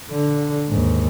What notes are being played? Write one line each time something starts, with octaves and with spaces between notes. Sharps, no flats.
D3
D#2 G#2